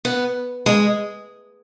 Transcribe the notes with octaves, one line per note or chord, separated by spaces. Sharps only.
B3
G#3